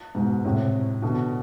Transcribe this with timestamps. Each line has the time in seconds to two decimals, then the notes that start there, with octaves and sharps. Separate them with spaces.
0.15 G#2 B2
0.45 A2 C3
1.02 B2 D3